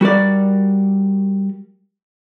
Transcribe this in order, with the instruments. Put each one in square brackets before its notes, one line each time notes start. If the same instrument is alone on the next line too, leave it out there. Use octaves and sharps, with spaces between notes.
[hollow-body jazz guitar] G3 F#4 A#4 D5